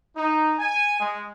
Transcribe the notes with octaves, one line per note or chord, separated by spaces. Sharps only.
D#4
G#5
G#3